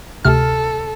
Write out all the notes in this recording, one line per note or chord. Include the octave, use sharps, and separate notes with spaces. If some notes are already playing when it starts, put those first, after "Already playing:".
D2 C3 A4 F6